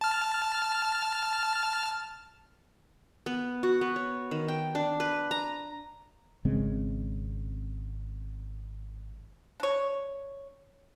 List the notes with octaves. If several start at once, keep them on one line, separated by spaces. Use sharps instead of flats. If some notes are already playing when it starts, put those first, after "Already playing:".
A5 F6
B3
F#4
B3
C#5
D#3
G5
D4
B4
A#5
G#1 C#3 G#3 C4
D4 C#5